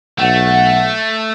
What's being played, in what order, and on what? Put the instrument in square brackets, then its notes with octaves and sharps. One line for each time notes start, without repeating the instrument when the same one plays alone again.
[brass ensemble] B1 F#5 [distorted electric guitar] A3